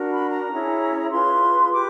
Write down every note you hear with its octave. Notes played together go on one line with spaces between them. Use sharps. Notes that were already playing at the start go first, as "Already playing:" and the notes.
Already playing: D4 F#4 A#4
B5
A#5
C#4 E4 G#4 C#5
F4 G#4 B4 C6
G4 B4 D6